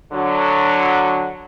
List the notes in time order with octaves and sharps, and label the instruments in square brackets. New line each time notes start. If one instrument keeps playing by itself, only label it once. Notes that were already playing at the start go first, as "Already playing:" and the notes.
[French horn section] D3 F#3